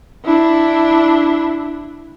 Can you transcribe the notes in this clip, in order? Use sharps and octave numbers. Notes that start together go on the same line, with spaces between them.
D4 E4